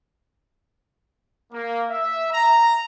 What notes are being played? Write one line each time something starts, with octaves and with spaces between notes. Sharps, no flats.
A#3
E5
A#5